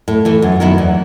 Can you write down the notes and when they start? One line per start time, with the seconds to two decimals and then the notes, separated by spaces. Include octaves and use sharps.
0.08 A2
0.25 E3 A3
0.42 F#2
0.60 D#3 F#3 B3 E4
0.78 E2